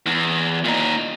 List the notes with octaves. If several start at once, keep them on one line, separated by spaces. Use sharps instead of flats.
E2
A#2 D#4